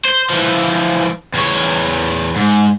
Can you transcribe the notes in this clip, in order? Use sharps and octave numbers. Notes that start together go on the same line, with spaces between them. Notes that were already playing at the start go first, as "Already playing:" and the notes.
C5
E3 F3
E2 C#5
G#2